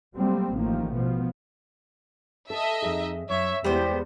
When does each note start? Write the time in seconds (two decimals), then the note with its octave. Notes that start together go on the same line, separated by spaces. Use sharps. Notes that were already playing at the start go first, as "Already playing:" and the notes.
0.15 F#3 G3 A3 A#3 C4
0.55 A1 D#3 F3 A3 A#3
0.92 B2 F3 B3
2.50 A4 D#5 E5
2.82 F2 D#4 G#4
3.30 F#2 C#5 E5
3.64 E2 G3 G#3 B3 G4 C5